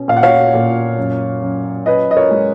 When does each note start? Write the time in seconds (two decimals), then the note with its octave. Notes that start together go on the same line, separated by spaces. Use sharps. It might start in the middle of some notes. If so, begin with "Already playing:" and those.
Already playing: B2 C#4
0.08 A#2 F5
0.17 F#5
0.23 C#5 F5
0.54 A#2
0.98 F#2
1.41 F#2
1.86 C#4 B4 D#5
2.11 D#5
2.17 A#4 C#5
2.31 G#3